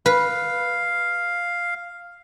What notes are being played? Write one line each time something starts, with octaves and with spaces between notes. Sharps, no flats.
B4 F5